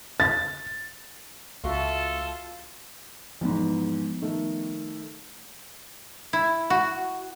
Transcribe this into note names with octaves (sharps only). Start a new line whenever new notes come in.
A6
C#2 F4 F#4 A4 E5
E2 G#2 F3 B3
D#3 A3
E4
F#4